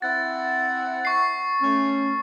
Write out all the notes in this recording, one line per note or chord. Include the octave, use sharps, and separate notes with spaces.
C4 E4 F#5 A6
C#6 C7
A3 C#4